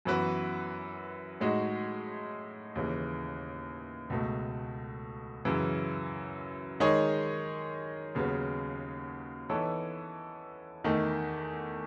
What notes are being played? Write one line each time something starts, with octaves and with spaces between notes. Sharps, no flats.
F#2 E3 B3 F#4 B4
A2 G#3 D#4 F#4
D#2 C#3 E3
C#2 B2 A3
F#2 C#3 E3
D#3 G#3 D#4 G#4 C#5
D#2 C#3 F#3 B3
E3 B3 D#4 A4 C#5
E2 D#3 A3 D#4